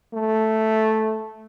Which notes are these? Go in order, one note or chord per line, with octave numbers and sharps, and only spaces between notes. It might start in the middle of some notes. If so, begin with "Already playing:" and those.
A3